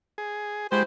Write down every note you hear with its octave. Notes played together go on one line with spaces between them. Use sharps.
G#4
G#3 E4 F#4 G4 C5